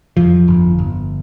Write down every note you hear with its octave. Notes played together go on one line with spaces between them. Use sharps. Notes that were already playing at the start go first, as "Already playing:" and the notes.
F2 F3
G1
G1